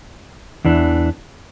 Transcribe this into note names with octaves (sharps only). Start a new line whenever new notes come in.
E2 E3 D4